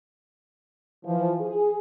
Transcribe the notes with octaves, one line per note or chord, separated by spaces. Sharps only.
E3 F3
G#4